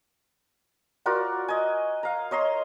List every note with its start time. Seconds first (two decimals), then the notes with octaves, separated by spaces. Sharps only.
1.06 F4 F#4 A#4 D5
1.48 D#5 G#5
2.03 F5 A#5
2.31 C#5 D#5 A#5 C6